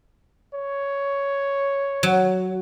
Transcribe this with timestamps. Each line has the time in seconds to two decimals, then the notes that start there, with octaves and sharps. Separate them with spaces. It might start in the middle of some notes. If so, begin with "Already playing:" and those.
0.54 C#5
2.03 F#3